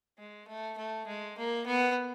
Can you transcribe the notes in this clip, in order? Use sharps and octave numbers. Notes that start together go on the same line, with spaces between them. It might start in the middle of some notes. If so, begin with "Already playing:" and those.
G#3
A3
A3
G#3
A#3
B3